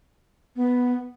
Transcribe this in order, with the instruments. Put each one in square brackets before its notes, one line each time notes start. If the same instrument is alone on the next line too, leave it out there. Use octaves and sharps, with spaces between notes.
[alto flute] B3